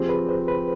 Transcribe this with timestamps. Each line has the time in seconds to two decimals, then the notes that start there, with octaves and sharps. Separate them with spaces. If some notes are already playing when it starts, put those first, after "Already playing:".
Already playing: F3 C4 G4 G#4
0.09 B4
0.29 C5
0.48 B4